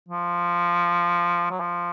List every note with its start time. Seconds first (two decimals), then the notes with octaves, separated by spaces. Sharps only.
0.09 F3
1.51 F#3
1.60 F3